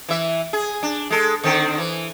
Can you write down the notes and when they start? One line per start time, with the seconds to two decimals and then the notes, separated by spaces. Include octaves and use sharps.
0.09 E3 E5
0.53 G#4
0.83 D4
1.11 G#3 A4
1.44 D3 D#3 C4
1.78 E3